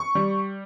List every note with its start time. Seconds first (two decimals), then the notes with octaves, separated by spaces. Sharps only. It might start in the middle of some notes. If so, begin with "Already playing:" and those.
Already playing: C#6
0.15 G3